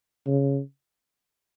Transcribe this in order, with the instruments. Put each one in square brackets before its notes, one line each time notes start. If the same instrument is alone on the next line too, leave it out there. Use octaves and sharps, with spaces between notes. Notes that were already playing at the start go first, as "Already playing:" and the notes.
[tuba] C#3